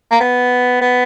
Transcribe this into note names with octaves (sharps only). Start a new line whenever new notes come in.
A#3
B3
B3